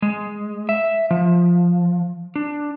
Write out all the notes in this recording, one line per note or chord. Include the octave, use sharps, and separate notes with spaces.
G#3
E5
F3
D4